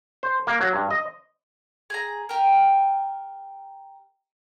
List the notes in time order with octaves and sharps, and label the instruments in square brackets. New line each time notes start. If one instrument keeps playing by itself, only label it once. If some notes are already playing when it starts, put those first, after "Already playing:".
[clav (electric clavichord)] C5
A#3
F#3
G2
D#5
[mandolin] G#4 A#5
G4 A#4